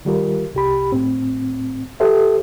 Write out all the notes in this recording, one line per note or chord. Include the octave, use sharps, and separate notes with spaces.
D#3 G3 F4 A#4
C2 G4 B5
A2 C4
G4 A4 C5 E5